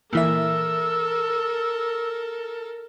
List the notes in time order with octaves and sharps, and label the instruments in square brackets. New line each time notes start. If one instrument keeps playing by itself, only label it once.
[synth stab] A#2 E3 E5 [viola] A4 A#4 [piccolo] E6